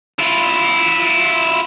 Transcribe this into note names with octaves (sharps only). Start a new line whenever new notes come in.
E4 F4